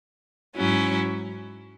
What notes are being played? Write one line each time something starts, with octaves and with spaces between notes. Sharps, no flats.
G#2 F#3 C#4 E4